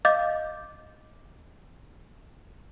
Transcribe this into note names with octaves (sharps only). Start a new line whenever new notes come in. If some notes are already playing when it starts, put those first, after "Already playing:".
D#5 F5 D6 G6 A6